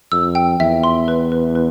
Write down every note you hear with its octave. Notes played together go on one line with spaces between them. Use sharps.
F2 E6
G5
E2 E5
C6
B4
B4
B4